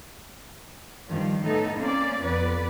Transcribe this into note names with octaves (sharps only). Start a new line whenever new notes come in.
G2 D#3 F3 G3
A2 B3 D#4 A4
A#3 C4 C#4 D5
F2 B3 B4 D5